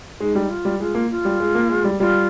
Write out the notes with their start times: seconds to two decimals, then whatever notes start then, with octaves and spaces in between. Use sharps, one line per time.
0.20 G#3 D#4
0.35 G3
0.50 F4
0.65 G3
0.80 G#3 F4
0.95 A#3
1.10 F4
1.25 G3
1.40 G#3
1.55 A#3
1.70 G#3
1.84 G3
2.00 G3 F4